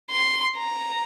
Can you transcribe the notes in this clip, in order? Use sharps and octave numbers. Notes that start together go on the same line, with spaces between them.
C6
A#5